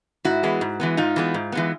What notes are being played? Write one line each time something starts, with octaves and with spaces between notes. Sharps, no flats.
G#2 E4 F#4
E3 G#3 B3
G#2
E3 G#3 B3
G#2 D#4 F4
E3 G#3 B3
G#2
E3 G#3 B3